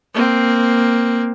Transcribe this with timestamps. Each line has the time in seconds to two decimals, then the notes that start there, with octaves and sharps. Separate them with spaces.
0.14 A#3 C4